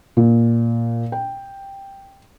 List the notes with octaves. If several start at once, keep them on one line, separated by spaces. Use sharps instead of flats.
A#2
G5